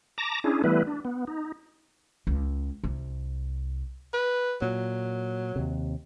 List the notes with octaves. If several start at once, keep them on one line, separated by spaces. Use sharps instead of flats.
A5 A#5 D6 A#6
C#4 D4 E4 G#4
E3 G3 A3 B3 E4 B4
D4
B3
D#4
C#2
C2
B4
A#2 F#3
D#2 C3